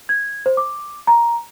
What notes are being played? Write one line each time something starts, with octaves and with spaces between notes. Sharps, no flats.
G#6
C5
D6
A#5